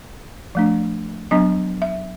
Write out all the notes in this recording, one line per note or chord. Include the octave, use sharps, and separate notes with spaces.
F3 A3 D4
F#3 B3 D4 D#5
E5